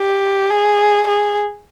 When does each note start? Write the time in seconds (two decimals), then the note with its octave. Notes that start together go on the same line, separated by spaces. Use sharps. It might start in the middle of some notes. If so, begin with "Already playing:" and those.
Already playing: G4
0.50 G#4
1.07 G#4